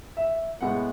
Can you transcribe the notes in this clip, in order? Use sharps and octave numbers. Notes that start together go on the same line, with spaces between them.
E5
A2 G#3 B3 F#5